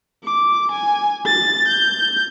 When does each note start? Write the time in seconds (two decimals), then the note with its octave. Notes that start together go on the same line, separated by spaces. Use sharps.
0.24 D6
0.71 G#5
1.26 A6
1.68 G6